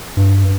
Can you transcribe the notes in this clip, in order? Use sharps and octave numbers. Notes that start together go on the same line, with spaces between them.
G2